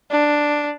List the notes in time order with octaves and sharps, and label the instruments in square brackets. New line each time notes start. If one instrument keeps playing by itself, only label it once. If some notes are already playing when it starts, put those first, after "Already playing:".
[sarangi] D4